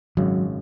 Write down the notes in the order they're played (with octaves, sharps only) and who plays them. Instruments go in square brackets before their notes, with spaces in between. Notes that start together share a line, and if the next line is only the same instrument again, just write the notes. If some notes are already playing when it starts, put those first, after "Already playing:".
[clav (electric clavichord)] G#1 F#2 C#3 [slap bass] F#3